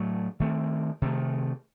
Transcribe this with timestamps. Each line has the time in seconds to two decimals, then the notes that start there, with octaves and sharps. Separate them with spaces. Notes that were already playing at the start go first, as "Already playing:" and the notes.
Already playing: A2 F#3 A3
0.40 D#3 A3 C4
1.02 C3 D#3 A3